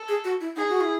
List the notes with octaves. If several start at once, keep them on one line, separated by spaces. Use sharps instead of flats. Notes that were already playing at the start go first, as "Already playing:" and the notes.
Already playing: A4
G#4
F#4
E4
D#4 G#4
F#4
E4